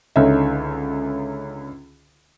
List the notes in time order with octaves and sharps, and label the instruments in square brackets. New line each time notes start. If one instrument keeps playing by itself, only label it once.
[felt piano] C#2 D3 C#4 D#4 E5